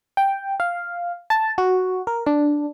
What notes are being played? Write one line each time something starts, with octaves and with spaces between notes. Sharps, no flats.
G5
F5
A5
F#4
A#4
D4